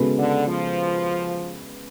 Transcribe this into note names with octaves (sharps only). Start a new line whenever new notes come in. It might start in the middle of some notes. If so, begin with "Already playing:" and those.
Already playing: C#3 G#3 B3 F#4 A4
D3
F3